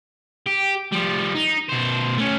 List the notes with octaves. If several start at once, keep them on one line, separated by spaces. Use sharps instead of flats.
G4
F3 G3
D#4
B2 C5
A3 C#4